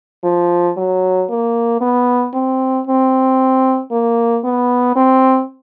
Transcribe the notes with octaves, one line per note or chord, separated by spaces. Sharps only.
F3
F#3
A#3
B3
C4
C4
A#3
B3
C4